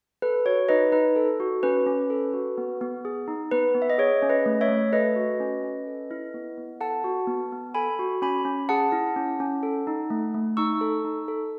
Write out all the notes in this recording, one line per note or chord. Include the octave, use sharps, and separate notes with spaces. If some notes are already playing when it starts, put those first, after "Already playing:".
A4 B4
F#4 C#5
D#4 B4 D#5
D#4 B4
A4
F#4
C#4 B4
C#4
A4
F#4
B3
B3
G#4
D#4
B3 B4
B3
E5
D#5
G#4 C#5
C#4
B4 D#5
A3
C#5 E5
A3
A4 B4 D#5
F#4
C#4
C#4
A4
E4
B3
B3
A4 F#5 A5
F#4
B3
B3
A4 G#5 B5
F#4
C#4 G#5 B5
C#4
G#4 F#5 A5
E4
C#4
C#4
A4
D#4
A3
A3
D#4 C#6 E6
A4
D#4
A4